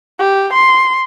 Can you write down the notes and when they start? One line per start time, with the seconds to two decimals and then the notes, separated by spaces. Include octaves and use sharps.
0.19 G4
0.53 C6